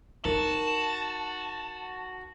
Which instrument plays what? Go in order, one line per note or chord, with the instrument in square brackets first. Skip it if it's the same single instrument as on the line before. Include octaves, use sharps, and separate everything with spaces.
[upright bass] D#4 [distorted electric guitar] F#4 [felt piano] A#4 [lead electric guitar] A5